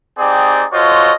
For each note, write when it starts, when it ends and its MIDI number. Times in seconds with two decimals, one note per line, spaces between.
0.19 0.66 60
0.19 0.66 63
0.19 0.66 67
0.19 0.66 68
0.19 0.66 74
0.72 1.13 65
0.72 1.13 66
0.72 1.13 69
0.72 1.13 72
0.72 1.13 73
0.72 1.13 75